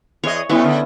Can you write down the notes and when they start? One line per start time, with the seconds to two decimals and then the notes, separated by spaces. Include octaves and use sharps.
0.24 E2 G#4 C#5 D#5
0.49 B2 G3 A3 B3 C#4 E4
0.64 D3